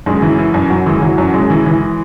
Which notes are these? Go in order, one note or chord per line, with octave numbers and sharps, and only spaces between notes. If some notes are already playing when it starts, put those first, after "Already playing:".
F#2 G#3
E3
E3
F#2
F#2 F#3
E3 G#3
E3 F#3
F#2 F#3
F#2 G#3
E3
E3